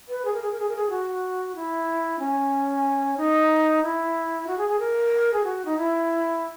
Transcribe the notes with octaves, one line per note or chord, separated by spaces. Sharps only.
B4
G#4
A#4
G#4
A#4
G#4
A#4
G#4
F#4
E4
C#4
D#4
E4
F#4
G#4
G#4
A#4
G#4
F#4
D#4
E4